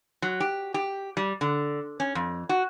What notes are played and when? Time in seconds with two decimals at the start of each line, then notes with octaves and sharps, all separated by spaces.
0.22 F#3
0.40 G4
0.74 G4
1.17 G3
1.41 D3
2.00 C#4
2.15 F2
2.49 F#4